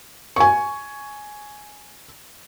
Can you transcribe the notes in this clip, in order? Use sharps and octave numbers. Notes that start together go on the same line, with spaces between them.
G#5 C#6